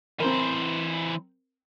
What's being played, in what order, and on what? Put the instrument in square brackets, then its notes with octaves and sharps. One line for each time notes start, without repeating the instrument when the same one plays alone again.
[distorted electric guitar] E3 C5 [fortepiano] C4 A#4